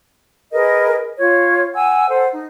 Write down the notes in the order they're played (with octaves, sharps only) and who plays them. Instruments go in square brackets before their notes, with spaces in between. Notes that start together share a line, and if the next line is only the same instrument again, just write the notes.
[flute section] G#4 A#4 B4 D#5
F4 C#5
F#5 G#5 E6
A4 C5 F#5
D#4